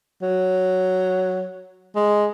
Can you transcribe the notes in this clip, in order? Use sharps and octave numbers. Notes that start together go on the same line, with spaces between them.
F#3
G#3